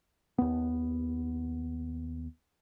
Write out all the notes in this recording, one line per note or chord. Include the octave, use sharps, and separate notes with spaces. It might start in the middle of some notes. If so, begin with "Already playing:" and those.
D#2 B3